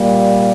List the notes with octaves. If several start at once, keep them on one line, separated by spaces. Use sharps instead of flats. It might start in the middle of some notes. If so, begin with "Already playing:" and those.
Already playing: A#2 G3 A#3